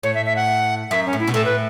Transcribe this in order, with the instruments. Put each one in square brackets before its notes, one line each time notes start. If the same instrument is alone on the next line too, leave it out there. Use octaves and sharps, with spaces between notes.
[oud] A2 [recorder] C#5
[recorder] E5
E5
F#5
[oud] F#2 [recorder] E5
[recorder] C#4
[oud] A2
[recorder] E4
[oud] B2
[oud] A2 [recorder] A4
[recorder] B4